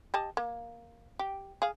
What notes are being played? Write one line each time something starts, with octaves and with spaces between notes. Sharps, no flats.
G4 D#5 A5
A#3
G4
G#4 F5